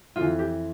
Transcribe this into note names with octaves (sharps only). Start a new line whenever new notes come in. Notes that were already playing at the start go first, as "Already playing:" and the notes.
F2 E3 F4
G4